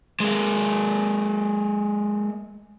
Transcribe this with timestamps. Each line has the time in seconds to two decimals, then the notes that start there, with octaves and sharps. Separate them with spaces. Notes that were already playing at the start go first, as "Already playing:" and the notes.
0.20 G#3 A#3